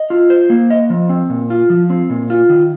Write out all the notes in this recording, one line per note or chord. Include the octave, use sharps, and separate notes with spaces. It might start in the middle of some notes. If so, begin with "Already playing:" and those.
Already playing: D#5
F4
C5
A#3
D#5
F3
C4
A#2
F4
F3
C4
A#2
F4
D#3